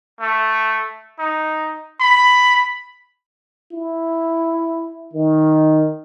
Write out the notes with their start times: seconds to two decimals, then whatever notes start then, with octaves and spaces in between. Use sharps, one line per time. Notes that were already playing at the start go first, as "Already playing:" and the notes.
0.21 A3
1.19 D#4
2.00 B5
3.73 E4
5.13 D#3